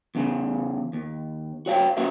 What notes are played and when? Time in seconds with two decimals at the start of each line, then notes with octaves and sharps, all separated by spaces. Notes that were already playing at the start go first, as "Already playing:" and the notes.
0.15 E2 C#3
0.93 D#2
1.66 F#4 C#5 F5 G5
1.97 A#3 C#4 F#4 A#4 B4 E5